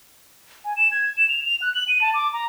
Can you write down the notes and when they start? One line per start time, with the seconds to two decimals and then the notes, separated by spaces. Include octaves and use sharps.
0.65 G#5
0.76 E7
0.92 G#6
1.17 E7
1.29 F7
1.45 F7
1.62 F#6
1.75 F#7
1.88 D#7
2.01 A5
2.14 D6
2.33 A#5